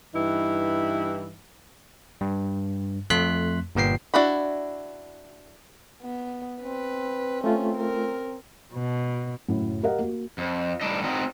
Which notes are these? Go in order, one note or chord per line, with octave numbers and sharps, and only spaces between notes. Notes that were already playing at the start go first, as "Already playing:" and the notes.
G2 E3 D#4 E4
G2
F2 A3 C6 F#6 B6
G1 A#2 B3 G5 C7
D4 E4 F#4 B5
B3
C4 B4
A3 C#4 F4
A#4
B2
F#1 F#2 A2 F#3
G4 A#4 D#5 F5 F#5
A#3 F#4
F2
A2 G3 D4 D#4 D#5
C4 D#4 F#4